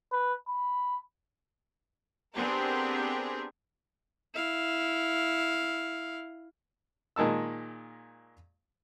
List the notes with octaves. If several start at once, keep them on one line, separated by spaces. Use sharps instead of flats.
B4
B5
B3 C4 D4 G4 G#4 A#4
E4 F5
A#2 D#3 G#3 A5 E6